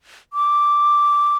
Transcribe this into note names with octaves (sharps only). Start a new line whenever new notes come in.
D6